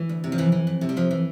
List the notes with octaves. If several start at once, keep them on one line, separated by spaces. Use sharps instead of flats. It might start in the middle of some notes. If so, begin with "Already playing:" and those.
Already playing: E3
D2
C3
F3
F2 E3
E3
F2
C3
G3
F2 F3
E3